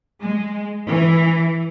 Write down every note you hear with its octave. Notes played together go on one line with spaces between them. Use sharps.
G#3
E3